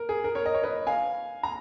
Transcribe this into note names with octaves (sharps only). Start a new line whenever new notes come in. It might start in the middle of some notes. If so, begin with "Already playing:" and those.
Already playing: A#4
G#4
A#4
A#4 C#5
D#5
C#5
B4 D#5
F5 G#5
A#5